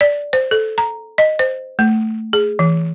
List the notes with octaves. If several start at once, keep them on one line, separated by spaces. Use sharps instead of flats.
D5
C5
A4
A#5
D#5
C5
A3
G#4
E3